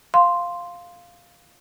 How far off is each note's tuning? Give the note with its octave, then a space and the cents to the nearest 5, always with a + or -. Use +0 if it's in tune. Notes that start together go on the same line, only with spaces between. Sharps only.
F5 +0 C6 +0